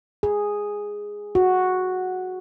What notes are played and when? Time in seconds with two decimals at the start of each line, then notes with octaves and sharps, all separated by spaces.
0.23 G#4
1.35 F#4